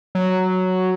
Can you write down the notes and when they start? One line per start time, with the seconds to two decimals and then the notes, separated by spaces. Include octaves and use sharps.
0.15 F#3